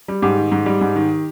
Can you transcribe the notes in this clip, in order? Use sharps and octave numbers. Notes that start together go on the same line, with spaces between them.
G3
G#2 G4
D#3
G#2
G3
G#2
D#3